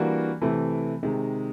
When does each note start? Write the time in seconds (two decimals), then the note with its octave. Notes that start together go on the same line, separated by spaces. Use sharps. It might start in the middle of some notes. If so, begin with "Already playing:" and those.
Already playing: E3 G3 A#3 D4 F#4
0.41 C3 E3 A3
1.03 C3 D#3 G#3